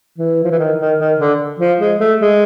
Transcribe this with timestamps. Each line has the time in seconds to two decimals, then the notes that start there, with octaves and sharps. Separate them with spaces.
0.18 E3
0.44 F3
0.51 E3
0.59 D#3
0.79 D#3
0.99 D#3
1.19 D3
1.60 F3
1.80 G#3
2.00 A3
2.20 G#3